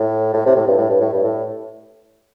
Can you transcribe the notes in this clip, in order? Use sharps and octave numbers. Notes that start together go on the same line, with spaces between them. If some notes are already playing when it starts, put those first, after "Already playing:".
Already playing: A2
A2
C3
A2
G2
A2
G2
A2
G2
A2